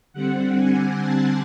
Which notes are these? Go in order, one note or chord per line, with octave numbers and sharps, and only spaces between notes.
D3 G3 C4 F#5
G#5
A5